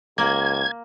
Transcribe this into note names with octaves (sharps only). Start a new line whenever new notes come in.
C#2 A#3 G#6